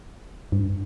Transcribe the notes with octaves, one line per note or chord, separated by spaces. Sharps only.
G2